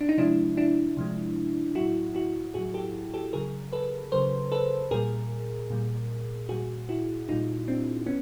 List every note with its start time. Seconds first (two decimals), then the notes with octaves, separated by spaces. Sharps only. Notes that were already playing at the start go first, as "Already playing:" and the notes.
0.01 D4
0.09 D#4
0.18 C3 F3 G#3 D4 E4
0.57 D4 E4
0.97 C3 F3 G#3
1.75 F#3 E4 F#4
1.81 A2
2.15 E4 F#4
2.54 A2 F#3 F#4 G#4
2.74 G4 A4
3.14 G4 A4
3.33 C#3 F#3 G#4 A#4
3.73 A4 B4
4.12 C#3 F#3 A#4 C5
4.52 A4 B4
4.91 A#2 G3 G#4 A#4
5.70 A#2 G3
6.49 A#2 G3 F#4 G#4
6.89 E4 F#4
7.29 A#2 G3 D#4 F4
7.68 C4 D4
8.06 B3 C#4